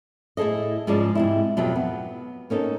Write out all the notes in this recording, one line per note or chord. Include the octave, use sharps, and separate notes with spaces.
A2 E4 G#4 A4 D#5
G#2 C#3 F3 G#3 D5 A5
G#2 C3 E4
F2 B2 F#3 G4 B4 E5
B3
A#3 C#4 D#4 A4